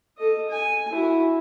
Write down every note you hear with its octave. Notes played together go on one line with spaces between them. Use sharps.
A4 D#5
G#5
E4 F#4